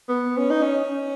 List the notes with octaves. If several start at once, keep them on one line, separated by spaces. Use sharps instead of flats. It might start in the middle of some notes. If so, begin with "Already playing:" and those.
B3
C#4
D#4
C#4